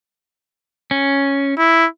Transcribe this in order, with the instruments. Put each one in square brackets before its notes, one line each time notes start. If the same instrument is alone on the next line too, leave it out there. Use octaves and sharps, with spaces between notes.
[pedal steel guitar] C#4
[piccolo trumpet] E4